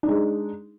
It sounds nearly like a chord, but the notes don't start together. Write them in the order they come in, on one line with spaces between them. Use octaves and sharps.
D4 D#4 G#3